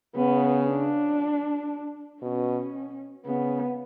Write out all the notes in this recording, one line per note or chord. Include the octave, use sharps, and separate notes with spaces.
C#3 B3
D4
B2 C#4
C#3 B3